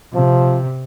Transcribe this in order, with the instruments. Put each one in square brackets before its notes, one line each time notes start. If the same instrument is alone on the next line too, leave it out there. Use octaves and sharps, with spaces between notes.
[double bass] C3 [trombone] F3